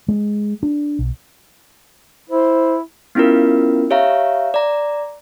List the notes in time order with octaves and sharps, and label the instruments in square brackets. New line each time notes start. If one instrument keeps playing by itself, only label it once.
[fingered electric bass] G#3
D4
B1
[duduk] E4 [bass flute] C5
[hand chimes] B3 C#4 E4 F4 A#4
G4 C#5 E5 F5 A#5
D5 A#5